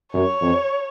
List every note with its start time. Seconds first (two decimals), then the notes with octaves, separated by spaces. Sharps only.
0.14 F#2 C#5
0.41 F2